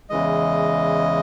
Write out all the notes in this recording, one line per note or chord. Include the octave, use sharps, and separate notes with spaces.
E2 C#3 E3 G#3 D#5